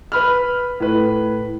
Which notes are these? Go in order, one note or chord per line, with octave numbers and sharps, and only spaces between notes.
B4 B5 F6
A2 B4